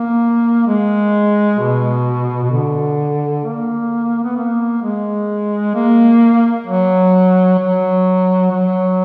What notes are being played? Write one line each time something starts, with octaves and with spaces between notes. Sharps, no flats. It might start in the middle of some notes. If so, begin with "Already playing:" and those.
Already playing: A#3
G#3
B2
B2
D3
A#3
B3
A#3
G#3
A#3
F#3
F#3
F#3